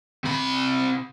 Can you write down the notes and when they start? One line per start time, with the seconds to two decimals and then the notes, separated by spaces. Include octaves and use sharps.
0.24 C3 B5